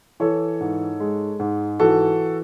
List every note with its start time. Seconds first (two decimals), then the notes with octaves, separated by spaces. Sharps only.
0.20 E3 A4 C#5
0.60 G#2
1.00 G#3
1.39 G#2
1.80 E3 F#4 A4